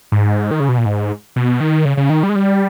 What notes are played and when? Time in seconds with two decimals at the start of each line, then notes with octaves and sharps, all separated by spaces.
0.12 G#2
0.51 D#3
0.60 C#3
0.69 B2
0.78 A#2
0.85 G#2
1.36 B2
1.60 D#3
1.85 C#3
1.97 C#3
2.10 D#3
2.23 G3
2.29 G#3
2.35 G3